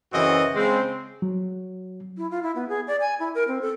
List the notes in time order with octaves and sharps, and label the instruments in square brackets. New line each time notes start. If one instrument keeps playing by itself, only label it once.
[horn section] F#2 C#3 E3 C4 F#4 D#5
C#3 G#3 C4
[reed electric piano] F#3
[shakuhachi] E4
F4
E4
B3
G#4
D5
G#5
E4
A#4
C4
A4